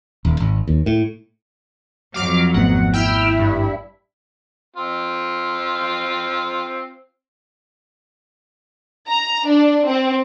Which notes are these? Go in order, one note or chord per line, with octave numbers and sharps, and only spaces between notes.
D#1
G#1
D#2
A2
F2 F#3 F5 D6 F6
G#1 A3 B3 F#5
E4 G5 E6 F6
G2
C4 F4
A#5
D4
C4